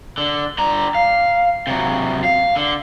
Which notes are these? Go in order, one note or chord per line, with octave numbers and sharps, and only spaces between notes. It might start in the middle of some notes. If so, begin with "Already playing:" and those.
D3
D3 A#5
F5
C3 F#3
F5
D3